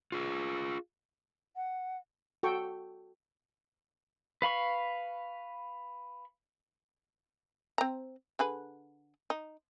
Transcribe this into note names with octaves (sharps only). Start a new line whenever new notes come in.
F4 G#4
F#5
F#4 A4 G5 C#6
B4 F5 B5 C#6
C4 A#5
D3 G#4 B4
D#4